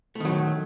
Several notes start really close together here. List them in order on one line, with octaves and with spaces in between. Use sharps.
A3 D#3 F#3